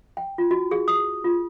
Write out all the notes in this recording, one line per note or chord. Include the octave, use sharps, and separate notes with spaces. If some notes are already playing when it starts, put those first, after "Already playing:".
G5
F4
F#4
G#4
D#6
F4